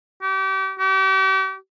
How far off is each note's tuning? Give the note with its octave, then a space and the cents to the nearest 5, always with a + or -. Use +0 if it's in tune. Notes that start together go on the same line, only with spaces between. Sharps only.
G4 -35
G4 -40